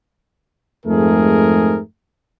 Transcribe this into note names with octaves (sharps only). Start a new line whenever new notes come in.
F2 G#2 A3 G#4 A#4